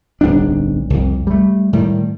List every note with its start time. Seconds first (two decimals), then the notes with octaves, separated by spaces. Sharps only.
0.21 D1 B1 G3 D4
0.90 C2 F2
1.27 G3 A3
1.73 A2 D#3 G3